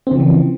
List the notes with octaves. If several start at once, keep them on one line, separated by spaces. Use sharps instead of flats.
C#3 E3 F3 C4